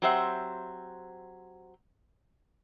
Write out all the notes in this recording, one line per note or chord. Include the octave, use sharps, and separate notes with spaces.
F#3 C4 G4 C5 E5 F#5